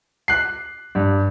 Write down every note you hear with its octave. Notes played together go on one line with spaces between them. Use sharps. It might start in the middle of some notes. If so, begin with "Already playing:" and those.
F#6 C7
G2